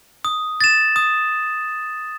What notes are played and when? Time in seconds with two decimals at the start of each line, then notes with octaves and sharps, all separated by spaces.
0.25 D#6
0.61 A6 E7
0.96 D#6